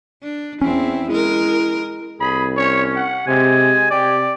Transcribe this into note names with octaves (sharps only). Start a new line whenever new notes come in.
D4
E2 C4 C#4 E4
G#3 E4 A#4
C2 G#4 B5
C#4 C#5
F#5
C3 G#3 G#5
C3 G4 D5